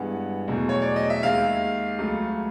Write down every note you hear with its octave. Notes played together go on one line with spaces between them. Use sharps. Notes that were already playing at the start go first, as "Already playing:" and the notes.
Already playing: G2 E3 G#3 B3 F#5
E2 B2 F#3 A3
C#5
D5
D#5
E5
D#2 D#3 G#3 F5
C#2 C#3 F#3 A3